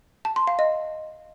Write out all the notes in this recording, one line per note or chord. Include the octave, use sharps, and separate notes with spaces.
A5
C6
F5
D#5